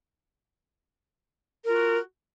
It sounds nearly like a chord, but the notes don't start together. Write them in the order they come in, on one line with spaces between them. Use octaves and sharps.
A#4 F4 F#4